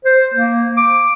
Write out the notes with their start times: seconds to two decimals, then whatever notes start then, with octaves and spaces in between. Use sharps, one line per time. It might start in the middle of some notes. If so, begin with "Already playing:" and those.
0.05 C5
0.34 A#3
0.77 D6